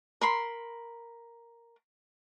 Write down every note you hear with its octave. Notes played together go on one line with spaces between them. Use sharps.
A#4 B5 C6